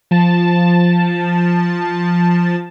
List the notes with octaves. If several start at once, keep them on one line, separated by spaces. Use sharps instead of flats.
F3 A5